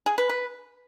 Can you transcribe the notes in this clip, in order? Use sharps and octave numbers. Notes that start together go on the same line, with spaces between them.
G#4
B4
B4